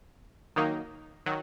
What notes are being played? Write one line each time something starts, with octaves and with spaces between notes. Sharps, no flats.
D#3 F#3 A#3 D#4
D#3 F#3